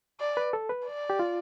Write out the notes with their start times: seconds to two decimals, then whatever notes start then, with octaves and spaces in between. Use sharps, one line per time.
0.20 D5
0.37 B4
0.53 A4
0.69 B4
0.86 D5
1.10 G4
1.19 F4